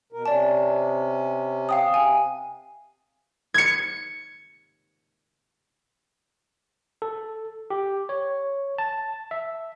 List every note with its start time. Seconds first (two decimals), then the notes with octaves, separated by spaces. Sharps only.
0.12 B2 A#4
0.26 C3 C#4 D5 A5
1.69 F5 G5 D#6
1.94 C3 G#5
3.54 G#6 C#7
7.02 A4
7.70 G4
8.09 C#5
8.78 A5
9.31 E5